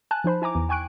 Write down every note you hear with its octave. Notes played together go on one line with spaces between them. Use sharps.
G#5 A5 F#6
F3 D#4 C5 B5
E4 G#5 A#5 D6
E2
G5 G#5 C#6 F#6 D7